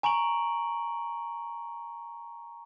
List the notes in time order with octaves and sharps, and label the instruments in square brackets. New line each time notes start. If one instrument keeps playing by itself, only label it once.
[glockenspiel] G#5 A#5 C#6 D7 F#7